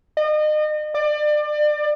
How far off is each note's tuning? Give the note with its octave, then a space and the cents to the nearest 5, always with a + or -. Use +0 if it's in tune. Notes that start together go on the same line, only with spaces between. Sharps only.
D#5 -35
D5 +30